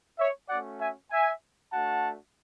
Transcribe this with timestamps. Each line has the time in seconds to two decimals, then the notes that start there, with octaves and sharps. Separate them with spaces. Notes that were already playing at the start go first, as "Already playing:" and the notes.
0.18 C#5 E5
0.49 A3 C#4 F#4 D5 F#5
0.80 E5 G#5
1.11 E5 G#5
1.73 A3 D4 F#4 F#5 A5